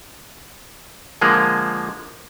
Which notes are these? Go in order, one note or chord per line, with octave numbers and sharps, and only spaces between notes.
D3 F3 G#3 A#3